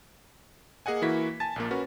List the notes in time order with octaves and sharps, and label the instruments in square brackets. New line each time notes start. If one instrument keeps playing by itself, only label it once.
[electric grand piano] A#3 G#4 D#5 F#5 G#5
E3 A#3 E4 F#4 B6
G#5 A5 A6
A#1 A#2 A#3
C#4 F#4 A#4 B4